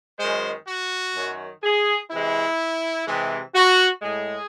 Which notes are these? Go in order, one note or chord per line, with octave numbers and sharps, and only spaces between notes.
F#2 D#3 G#3 C5
F#4
F#2 D#3 F#3
G#4
C3 E3 G#3 E4
C3 E3 G#3
F#4
A2 G#3 G#4